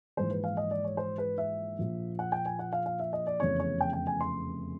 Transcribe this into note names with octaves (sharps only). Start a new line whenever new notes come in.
A#1 G#2 E3 C5
B4
F5
D#5
D5
C#5
C5
B4
E5
A#1 A#2 F3
F#5
G5
G#5
F#5
F5
F5
E5
D#5
D5
F1 E2 C#3 E3 C#5
C#5
G5
G5
G#5
C6